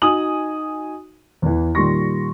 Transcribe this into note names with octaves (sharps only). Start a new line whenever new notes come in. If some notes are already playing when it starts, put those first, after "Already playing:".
D#4 F#4 G#5 D#6 F#7
E2 E3
A#2 D#3 G3 C6 C#6 A#6